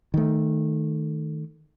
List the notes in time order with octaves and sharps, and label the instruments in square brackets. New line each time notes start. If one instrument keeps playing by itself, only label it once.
[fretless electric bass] D#3 A3